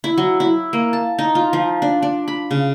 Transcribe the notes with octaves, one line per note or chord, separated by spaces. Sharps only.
E4
F#3
E4
A#3
A5
D#4
F4
F3
D4
D4
B5
C#3